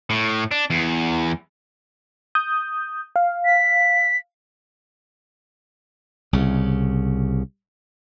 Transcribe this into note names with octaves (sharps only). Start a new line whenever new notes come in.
A2
D4
E2
D#6 G6
F5
B6
C2 C#3